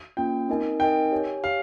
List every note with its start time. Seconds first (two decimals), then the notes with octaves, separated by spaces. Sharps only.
0.17 A#3 C#4 F4 G5
0.48 C4 D#4 A#4 D#5 G#5
0.80 C4 D#4 A#4 D#5 G5 G#5
1.12 G4 C#5 G#5
1.43 G4 C#5 F5 G#5